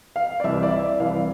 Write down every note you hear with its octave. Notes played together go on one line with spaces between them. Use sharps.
F5
D5
C2 C3 E3 E5
D5
E5
C2 C3 E3 F5